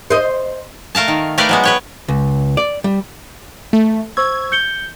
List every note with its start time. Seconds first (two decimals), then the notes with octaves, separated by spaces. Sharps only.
0.10 C5 D#5
0.95 A3 A#4 F5 A5
1.08 D#3
1.38 A3 G4 A#4 B4 D5 F5
1.49 F#3 G#3 B3
1.64 B4 C#5 G5
2.08 C#2
2.57 D5
2.84 G3
3.73 A3
4.17 C5 C#6 E6 G#6
4.52 G6 C#7 G7